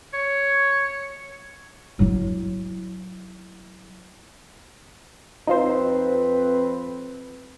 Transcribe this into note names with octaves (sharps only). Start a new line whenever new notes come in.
C#5
F#3 E4
F2 C4 D#4 F4 B4 C5